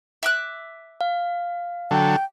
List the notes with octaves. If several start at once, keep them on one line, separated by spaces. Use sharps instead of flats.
E5 D6 F#6
F5
D3 F#3 A4 G5